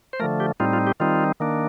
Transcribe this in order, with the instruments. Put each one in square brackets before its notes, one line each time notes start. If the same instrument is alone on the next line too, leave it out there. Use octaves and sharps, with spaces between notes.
[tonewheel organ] C5
D3 F3 A3 A#4
G4
A2 G3 C4 D#4 F4
F4
G4
D#3 G3 C4 D#4 F4
D#3 A#3 D4